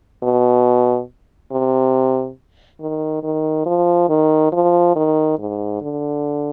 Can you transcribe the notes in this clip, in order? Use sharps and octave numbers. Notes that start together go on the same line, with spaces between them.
B2
C3
D#3
D#3
F3
D#3
F3
D#3
G#2
D3